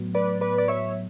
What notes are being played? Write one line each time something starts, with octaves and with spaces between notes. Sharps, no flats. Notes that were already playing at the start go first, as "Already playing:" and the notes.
Already playing: A2 F#3 B3
B4 D5
B4 D5
D5
C#5 E5